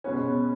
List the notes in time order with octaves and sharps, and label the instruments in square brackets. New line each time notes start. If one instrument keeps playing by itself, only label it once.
[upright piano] B2 G#3 B3 C#4